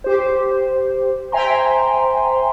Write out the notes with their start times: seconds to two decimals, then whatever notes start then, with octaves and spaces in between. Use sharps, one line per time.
0.04 G4 C5
1.32 C5 E5 G5 G#5 A#5 C6